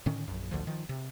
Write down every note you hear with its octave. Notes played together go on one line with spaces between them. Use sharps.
A2 D3 D#3 C#4
A#1 F#2
A1 D2 D3 F3
D#3 F3
C3